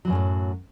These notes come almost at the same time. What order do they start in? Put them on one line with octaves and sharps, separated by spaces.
F#3 E3 F#2 C#3 A2